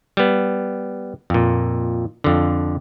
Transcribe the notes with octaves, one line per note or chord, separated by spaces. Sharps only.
G3 B3
F2 A#2
F2 D3